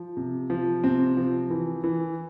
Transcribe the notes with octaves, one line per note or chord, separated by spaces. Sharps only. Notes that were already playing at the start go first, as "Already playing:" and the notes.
Already playing: F3
C3
F3
C3 C4
F3
E3
E3